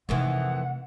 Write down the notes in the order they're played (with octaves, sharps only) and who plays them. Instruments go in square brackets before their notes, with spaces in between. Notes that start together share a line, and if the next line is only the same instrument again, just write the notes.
[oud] F2 D#3 E3 [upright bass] C3 A3 [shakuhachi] F#5